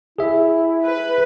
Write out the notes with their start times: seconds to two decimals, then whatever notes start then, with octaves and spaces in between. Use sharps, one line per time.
0.18 E4 G#4 E5
0.83 B4